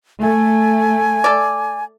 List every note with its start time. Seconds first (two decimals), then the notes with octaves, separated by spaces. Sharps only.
0.22 A3 G#5
1.24 A4 D5